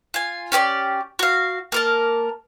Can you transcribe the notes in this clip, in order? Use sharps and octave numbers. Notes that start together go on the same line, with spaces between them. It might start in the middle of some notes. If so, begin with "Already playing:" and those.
F4 G#5
C#4 G4 C#5 D5
F#4 F5
A#3 A#4 A5